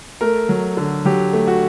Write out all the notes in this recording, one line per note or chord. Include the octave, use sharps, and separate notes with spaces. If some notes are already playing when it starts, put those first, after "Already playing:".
A3 A#4
F#3
D3
F#3 G4
A3
F#4